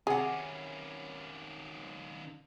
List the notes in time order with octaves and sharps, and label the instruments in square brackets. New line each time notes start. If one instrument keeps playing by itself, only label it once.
[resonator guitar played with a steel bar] C3 F#5 [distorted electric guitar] D#3 C#4 [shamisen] G#4